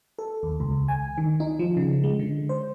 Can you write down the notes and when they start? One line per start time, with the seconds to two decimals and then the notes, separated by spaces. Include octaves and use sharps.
0.19 A4
0.43 D#2
0.60 C#2
0.88 G#5
1.18 D#3
1.40 D#4
1.59 F3
1.77 C#3
2.03 G#3
2.19 D3
2.49 C5